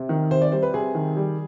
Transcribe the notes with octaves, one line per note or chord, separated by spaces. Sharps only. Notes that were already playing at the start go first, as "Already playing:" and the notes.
Already playing: C3
D#3
C3 C5
D5
G3 C5
B4
C3 G#4
D#3
G3